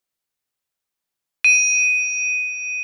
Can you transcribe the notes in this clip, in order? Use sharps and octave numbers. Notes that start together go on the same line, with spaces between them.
D#7